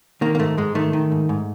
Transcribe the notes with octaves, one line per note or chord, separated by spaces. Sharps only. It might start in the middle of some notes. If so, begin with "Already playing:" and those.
D#3 A#3
A#3
G#2 A3
G#2 G#3
D#3 A3
D#3
G#2
G#2